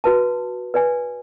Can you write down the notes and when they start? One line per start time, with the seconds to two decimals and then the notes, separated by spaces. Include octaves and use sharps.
0.04 F#4 B4 A5
0.74 B4 D5 G#5